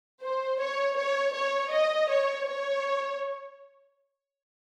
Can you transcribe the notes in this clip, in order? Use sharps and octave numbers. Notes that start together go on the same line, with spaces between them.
C5
C#5
C#5
C#5
D#5
C#5
C#5